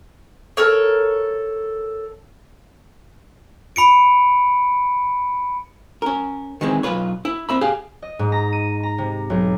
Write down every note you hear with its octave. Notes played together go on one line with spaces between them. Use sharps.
A4 A#4 C#5
B5 C#7 D7
C#4 A#4
D#3 E3 G#3 C4
B1 F2 F4 B4 C#5
E4
C4 E5 B5
G4 G#4 F5
D#5
G#2
A#5
D#7
A#5
C3
B1